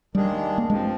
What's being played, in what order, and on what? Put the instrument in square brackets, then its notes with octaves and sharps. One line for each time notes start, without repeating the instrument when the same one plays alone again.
[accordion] D#2 D#3 G#3 D4 G#4 [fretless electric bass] G3
[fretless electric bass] A#3
[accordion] G2 F3 C4 [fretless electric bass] G#3